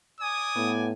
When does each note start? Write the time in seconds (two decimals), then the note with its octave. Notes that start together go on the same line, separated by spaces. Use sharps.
0.21 D5 G#5 D#6
0.56 A2 B3